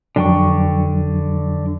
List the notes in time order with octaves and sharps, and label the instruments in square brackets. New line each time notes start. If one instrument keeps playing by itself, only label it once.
[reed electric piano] F2 F#3 D4 [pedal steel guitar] D3 G5 C#6